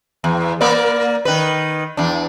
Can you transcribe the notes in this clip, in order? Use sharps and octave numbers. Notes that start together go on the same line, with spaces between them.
E2
A#3 A#4 D5
D#3 B4
E2 D4